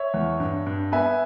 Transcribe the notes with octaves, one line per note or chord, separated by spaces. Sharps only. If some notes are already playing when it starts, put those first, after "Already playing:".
Already playing: C#5 E5
E2
G2
G2
B3 E5 G#5